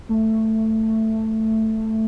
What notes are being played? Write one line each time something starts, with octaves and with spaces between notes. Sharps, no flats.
A3